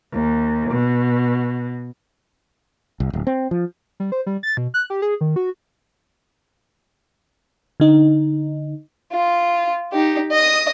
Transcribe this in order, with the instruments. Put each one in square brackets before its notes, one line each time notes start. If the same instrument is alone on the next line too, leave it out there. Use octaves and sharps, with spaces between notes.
[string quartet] D#2
B2
[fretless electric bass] C2
D1
C4
F3
[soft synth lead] G3
C5
G3
A6
B2
F#6
G4
G#4
D#3
F#4
[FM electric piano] D3 D#4
[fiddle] F4
D#4 G4
D#5 D#6